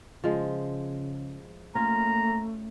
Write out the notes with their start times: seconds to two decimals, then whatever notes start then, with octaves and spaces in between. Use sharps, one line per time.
0.24 C#3 F3 G#3
1.75 A3 A#3 C#4 F4 A#5